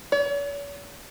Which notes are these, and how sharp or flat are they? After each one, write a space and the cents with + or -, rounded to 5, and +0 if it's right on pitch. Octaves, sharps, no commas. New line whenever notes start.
C#5 +45